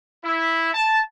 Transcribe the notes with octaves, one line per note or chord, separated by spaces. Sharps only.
E4
A5